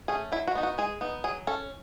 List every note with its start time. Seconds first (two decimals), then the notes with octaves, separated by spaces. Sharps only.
0.08 A3 C#4 G#4
0.32 F#3 E4
0.47 F#4
0.55 B3 D#4
0.63 F#4
0.78 G#3 G#4
1.01 B3 D#4
1.24 F#3 G#4
1.47 C#4 A4